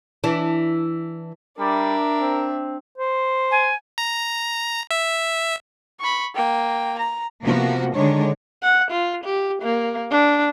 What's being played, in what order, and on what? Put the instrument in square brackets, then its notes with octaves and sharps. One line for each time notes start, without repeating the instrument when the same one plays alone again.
[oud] E3 D4
[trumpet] G3 [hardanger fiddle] D4 E5 [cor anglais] A#4
[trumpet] C4
[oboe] C5
[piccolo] G#5
[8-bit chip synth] A#5
E5
[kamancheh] B5 C#6
A#3 G5
A#5
[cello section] C3 F3 A#3 B3 F#4
D3 D#3 G#3 D4 C#5
[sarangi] F#5
F4
G4
A#3
D4